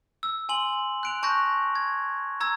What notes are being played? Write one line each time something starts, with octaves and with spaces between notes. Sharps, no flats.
E6
G#5 C6 F#7
F#6 D7 F7
A5 C#6 F#6 G6 A#6
G#6
A#5 E6 G#6